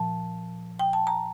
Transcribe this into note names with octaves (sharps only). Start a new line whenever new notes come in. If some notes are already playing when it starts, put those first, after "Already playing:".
Already playing: A#2 F3 A5
G5
A5
A#5